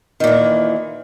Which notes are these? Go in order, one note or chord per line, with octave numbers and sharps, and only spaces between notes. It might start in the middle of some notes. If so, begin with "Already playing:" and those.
A#2 D#3 E3